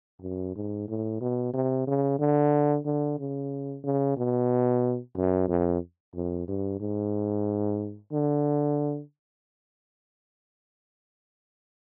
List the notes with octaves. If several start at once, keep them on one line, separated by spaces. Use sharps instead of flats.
F#2
G#2
A2
B2
C3
C#3
D3
D3
C#3
C#3
B2
F#2
F2
F2
G2
G#2
D3